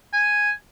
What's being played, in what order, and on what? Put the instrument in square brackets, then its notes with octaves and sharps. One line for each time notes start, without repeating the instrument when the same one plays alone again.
[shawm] G#5